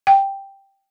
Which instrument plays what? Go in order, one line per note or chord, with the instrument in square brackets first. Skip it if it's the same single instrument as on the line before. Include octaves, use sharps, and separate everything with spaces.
[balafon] G5